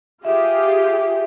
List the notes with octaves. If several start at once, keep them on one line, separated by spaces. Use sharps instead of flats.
F4 G4 G#4 E5